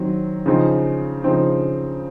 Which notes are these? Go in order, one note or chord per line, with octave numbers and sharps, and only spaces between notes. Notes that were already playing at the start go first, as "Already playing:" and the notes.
Already playing: D#3 F#3 C4
C#3 F3 C4 D#4
C#3 F3 C4 D#4